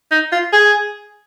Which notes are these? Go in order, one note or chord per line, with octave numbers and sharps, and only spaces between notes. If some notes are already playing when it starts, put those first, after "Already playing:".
D#4
F4
G#4